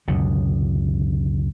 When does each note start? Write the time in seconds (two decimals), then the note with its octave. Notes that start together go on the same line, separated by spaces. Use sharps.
0.08 C#2 F#2 B2 D3